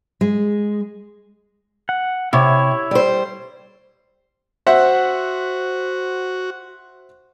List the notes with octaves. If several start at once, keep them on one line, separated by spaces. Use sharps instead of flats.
G#3
F#5
C3 E4 C#5
G3 C5
F#4 C5 E5 F#5